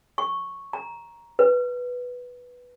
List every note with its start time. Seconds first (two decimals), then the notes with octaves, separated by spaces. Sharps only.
0.18 C#6
0.73 A#5
1.39 B4